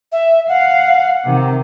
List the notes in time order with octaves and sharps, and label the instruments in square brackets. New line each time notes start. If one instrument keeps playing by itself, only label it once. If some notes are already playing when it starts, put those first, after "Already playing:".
[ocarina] E5
[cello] F5 [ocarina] F#5
[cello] C3 D#3